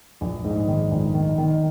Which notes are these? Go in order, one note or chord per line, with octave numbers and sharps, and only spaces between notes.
A#1
G#2
D#3
A#1
D#3
D#3